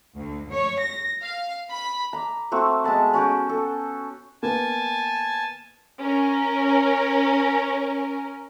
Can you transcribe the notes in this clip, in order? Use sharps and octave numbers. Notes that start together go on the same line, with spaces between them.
D2
C#5
A#6
F5
B5
A#5 B5 D6
A3 C4 F#4 F#5
G#3 B3 A5 B5
C#4 F#4 B4 G5
A4
A#3 B3 G#5 A5
C#4 A#4